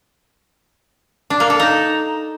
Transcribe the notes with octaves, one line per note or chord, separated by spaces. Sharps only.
D4
A#3
A4
D#4